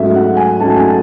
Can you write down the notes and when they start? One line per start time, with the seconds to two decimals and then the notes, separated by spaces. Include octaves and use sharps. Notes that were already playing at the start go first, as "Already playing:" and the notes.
Already playing: G#2 F#3 A3 C#4 E5
0.15 F#5
0.37 G#5
0.60 G#2 F#3 A3 C#4 A5
0.77 G#5